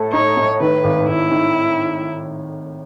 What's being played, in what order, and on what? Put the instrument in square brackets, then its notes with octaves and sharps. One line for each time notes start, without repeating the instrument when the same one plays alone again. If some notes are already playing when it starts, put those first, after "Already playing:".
Already playing: [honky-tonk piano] A2 A4
[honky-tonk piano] D#4 [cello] C#5
[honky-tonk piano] A2
[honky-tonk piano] D#3 [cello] B4
[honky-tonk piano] G#1
[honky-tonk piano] G#1 [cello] E4
[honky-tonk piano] D#3